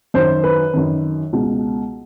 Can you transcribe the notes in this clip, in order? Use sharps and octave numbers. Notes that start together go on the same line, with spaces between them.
F#2 D#3 C5
B4
F#2 D#3
C#2 B2